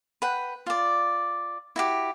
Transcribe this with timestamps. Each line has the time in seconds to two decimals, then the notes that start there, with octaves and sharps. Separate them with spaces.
0.22 B4 F#5 G5
0.66 F4 D5
1.76 E4 F#4 G4